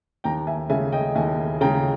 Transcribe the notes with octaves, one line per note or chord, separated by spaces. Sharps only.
D#2 G5 A#5
E5 G#5
C#3 G#3 E5 G#5
D#5 G5
D#2 E5 G#5
C#3 G#3 G5 A#5